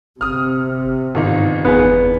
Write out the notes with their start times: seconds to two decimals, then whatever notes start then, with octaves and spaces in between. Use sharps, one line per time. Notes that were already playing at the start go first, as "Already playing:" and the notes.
0.21 G1 C3 D#6 F6
1.15 G1 G#2 D#3 D#4
1.65 F#1 E2 B3 G#4